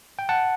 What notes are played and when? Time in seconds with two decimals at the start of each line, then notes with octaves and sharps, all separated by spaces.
0.19 G5
0.29 F#5 A5